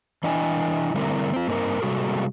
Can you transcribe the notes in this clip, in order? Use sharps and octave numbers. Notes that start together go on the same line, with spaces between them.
E3 D4 E4 D#5 G5 G#5
D3 G3 A3 C4 E4 A#4
C4 F4
G2 A#3 C4 D#4 A#4
C3 G3 G#3 A#3 F#4 A4